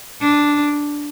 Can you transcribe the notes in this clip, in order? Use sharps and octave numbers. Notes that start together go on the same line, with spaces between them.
D4